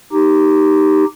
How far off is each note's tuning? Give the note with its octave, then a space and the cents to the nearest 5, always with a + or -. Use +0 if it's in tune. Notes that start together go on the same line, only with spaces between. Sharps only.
D#4 -5 G4 -5